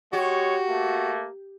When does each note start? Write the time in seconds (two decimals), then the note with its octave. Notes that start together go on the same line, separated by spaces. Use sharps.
0.13 G#3 F#4 G4 C#5
0.69 A3 A#3